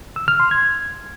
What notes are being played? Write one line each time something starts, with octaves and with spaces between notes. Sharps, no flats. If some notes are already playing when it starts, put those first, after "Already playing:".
E6
F6
C6
G#6